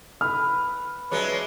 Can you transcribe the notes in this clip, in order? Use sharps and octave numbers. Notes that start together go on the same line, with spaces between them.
B4 F6
F#3 G#3 C#4 B4 D5 E5 A5